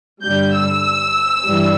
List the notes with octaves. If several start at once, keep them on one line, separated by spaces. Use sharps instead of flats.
G2 D3 G3 G6
E6
G2 E3 G3